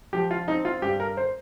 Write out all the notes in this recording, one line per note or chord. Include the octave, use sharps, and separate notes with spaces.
F3 G4
F4
C4 D#4
F4
G2 G4
A#4
C5